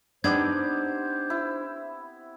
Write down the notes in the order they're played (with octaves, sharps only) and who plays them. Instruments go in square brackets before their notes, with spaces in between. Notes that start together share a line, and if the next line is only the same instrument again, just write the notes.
[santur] B3 C4 G4 [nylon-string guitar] D4 D#4 [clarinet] C5 [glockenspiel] G#6
[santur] E4